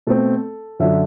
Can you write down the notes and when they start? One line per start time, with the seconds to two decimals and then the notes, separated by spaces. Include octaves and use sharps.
0.07 B2 A3 C4 A4
0.80 F#2 D3 F#3 E5